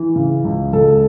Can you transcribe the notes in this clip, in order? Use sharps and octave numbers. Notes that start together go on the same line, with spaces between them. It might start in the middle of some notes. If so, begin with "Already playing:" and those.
Already playing: E3
C#3
C#2
C#2 A4